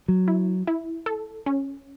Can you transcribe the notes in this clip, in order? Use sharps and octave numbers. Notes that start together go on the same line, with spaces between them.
F#3
E4
E4
A4
C#4